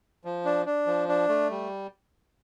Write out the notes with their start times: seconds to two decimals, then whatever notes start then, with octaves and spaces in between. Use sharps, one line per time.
0.25 F3
0.45 D4
0.66 D4
0.86 F3
1.08 D4
1.29 A3
1.50 G3